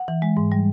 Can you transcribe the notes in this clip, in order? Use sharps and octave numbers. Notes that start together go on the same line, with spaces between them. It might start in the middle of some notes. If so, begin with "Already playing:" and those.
Already playing: F#5
E3
G#3
G#2
G3